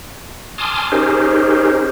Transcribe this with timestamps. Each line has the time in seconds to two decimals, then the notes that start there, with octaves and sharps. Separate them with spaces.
0.58 G#5 A5 C6 D6 D#6 F6
0.92 C#4 D#4 G4 G#4 A#4 C5